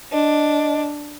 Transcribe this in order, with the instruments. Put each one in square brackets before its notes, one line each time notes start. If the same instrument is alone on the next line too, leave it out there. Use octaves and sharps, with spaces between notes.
[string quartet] D4 [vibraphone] D#5